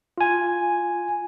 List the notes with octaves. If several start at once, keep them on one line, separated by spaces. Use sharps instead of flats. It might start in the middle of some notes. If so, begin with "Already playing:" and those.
F4 G#5